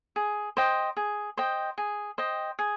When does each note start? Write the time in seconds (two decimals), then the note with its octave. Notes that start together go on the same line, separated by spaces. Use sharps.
0.16 G#4
0.57 C5 D#5 G5
0.97 G#4
1.37 C5 D#5 G5
1.78 G#4
2.18 C5 D#5 G5
2.59 G#4